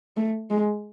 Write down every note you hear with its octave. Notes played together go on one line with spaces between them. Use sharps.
A3
G#3